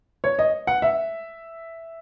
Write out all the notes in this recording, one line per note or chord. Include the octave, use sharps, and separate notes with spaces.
C#5
D#5
F#5
E5